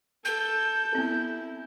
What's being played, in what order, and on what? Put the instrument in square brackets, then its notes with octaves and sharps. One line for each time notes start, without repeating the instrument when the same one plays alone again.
[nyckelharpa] A4 [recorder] G6
[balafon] B3 C4 [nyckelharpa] E4